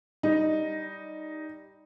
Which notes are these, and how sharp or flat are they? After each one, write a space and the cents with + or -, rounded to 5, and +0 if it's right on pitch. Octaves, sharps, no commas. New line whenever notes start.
G3 +0 D#4 +0